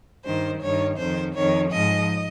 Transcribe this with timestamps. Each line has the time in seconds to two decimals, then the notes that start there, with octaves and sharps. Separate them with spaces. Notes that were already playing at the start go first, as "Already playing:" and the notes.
0.25 G2 D#3 C5
0.62 G2 D#3 C#5
0.99 F2 D#3 C5
1.35 F2 D#3 C#5
1.72 G#2 F3 D#5